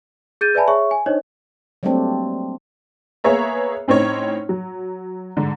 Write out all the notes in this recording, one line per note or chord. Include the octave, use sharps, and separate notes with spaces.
G#4 G6 A6 D#7
B4 D5 E5 G#5 A5 B5
G#4 C#5 E5 C#6
G#5
D4 D#4 C5 C#5 D#5
F#3 G3 A3 A#3 C4 D4
A#3 B3 G#4 C#5 E5 A#5
A2 C4 C#4 D#4 C#5
F#3
G#2 D3